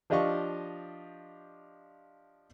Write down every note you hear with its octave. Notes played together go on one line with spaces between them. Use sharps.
F3 D4 G4 D#5 F5 C#6